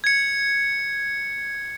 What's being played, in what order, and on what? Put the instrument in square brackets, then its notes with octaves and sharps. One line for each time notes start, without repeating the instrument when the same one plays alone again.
[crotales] G#6 C#7